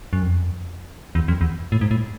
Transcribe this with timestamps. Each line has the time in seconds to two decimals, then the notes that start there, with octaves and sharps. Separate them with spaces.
0.13 F#2
0.22 F2
1.15 E2
1.28 F2
1.41 E2
1.72 A2
1.81 G#2
1.91 A2